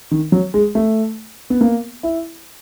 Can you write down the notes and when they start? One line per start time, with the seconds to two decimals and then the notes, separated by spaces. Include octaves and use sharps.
0.11 D#3
0.32 F#3
0.54 G#3
0.75 A3
1.50 B3
1.61 A#3
2.03 E4